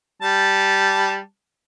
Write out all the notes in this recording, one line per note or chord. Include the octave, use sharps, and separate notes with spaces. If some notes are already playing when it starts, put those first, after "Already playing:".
G3 A5